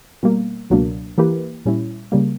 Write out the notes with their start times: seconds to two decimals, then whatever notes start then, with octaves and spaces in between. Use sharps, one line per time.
0.23 B2 G3 A#3
0.70 C#2 B2 F#3 A#3 D4
1.18 E3 A#3 E4 G4 B4
1.65 A#2 G3 C#4 E4
2.12 C#3 G3 A#3